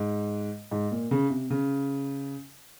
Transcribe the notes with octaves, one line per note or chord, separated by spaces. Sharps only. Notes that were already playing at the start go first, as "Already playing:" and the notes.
Already playing: G#2
G#2
A#2
C#3
C3
C#3